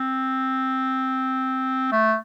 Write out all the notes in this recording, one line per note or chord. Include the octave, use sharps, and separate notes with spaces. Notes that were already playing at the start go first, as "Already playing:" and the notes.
Already playing: C4
A3